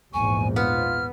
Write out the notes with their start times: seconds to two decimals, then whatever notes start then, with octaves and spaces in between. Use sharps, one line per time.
0.14 A#1 E2 G#2 G#5 C#6
0.56 B3 F4 F6